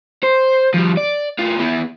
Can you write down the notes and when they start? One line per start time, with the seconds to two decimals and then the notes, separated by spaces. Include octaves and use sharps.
0.24 C5
0.74 F3 G3
0.97 D5
1.39 A2 F4
1.59 E3 B3